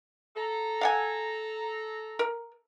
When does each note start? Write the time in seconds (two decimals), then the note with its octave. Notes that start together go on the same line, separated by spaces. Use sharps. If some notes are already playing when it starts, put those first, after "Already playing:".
0.37 A4 A#5
0.81 F5 F#5 G#5
2.19 A#4